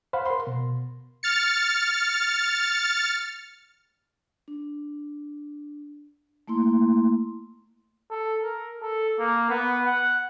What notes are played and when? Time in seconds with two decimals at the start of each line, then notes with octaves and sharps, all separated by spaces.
0.13 C5 F5 F#5 B5
0.26 A#4 C6
0.47 B2
1.23 F6 A6 C#7
4.48 D4
6.48 A3 A#3 E4 C6
8.11 A4
8.42 A#4
8.82 A4
9.19 A#3
9.50 B3
9.85 F#5